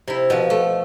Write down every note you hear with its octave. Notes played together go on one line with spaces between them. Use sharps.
C3 E4
B2 F3
A3